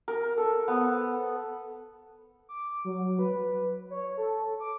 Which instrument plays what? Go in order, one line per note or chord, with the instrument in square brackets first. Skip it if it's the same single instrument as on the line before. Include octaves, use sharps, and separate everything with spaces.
[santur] A#4
A4
B3
[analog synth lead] D6
F#3
B4
C#5
A4
D6